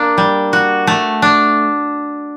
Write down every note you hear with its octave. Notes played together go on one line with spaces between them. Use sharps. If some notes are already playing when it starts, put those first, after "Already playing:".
Already playing: A#3 D4
G3
F#4
A3
D4